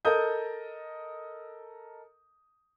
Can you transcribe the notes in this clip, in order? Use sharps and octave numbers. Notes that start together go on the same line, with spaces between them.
A4 A#4 D#5 D#6 G6